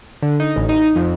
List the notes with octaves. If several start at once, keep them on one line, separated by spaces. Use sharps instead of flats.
D3
D#4
A1
D#4
F2